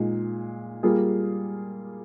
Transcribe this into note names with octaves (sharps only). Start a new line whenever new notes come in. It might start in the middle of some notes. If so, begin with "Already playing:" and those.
Already playing: A#2 G#3 D#4
G3 A#3 F4 G#4